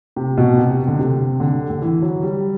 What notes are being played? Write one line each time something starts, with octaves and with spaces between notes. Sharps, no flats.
C3
B2
C3
D3
C3
D3
D3
E3
F#3
G3